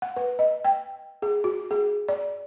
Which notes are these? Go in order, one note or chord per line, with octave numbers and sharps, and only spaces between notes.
F#5
B4
D#5
G5
G#4
F#4
G#4
D5